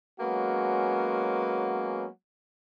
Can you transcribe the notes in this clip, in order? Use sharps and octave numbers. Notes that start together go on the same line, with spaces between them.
F#3 G#3 A#3 B3 C#4 F#4